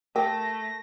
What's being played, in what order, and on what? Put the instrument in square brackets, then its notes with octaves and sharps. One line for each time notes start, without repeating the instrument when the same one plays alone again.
[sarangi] A3 [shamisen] G4 [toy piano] A#4 [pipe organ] A#6